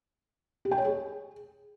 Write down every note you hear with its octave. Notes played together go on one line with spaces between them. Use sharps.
G4
G5
C#5
G#4